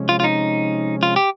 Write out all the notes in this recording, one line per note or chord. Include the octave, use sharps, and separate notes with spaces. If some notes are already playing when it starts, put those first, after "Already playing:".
Already playing: C3 F3 G#3 C#4
F4
F4
D#4
F4
G4